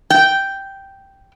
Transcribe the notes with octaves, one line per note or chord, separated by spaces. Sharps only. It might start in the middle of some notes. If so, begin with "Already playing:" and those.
G5